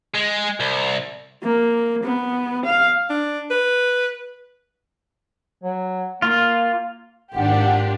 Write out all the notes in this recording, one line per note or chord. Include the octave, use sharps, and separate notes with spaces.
G#3
C2
A#3
B3
F5
D4
B4
F#3
A#3 F4
G#1 D4 F4 G4 F#5